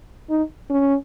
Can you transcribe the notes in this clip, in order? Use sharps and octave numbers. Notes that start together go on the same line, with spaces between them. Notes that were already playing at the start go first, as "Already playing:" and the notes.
D#4
C#4